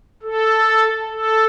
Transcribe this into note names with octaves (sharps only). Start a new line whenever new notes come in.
A4
A4